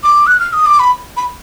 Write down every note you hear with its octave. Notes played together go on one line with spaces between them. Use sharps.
D6
F#6
F6
D#6
D6
B5
B5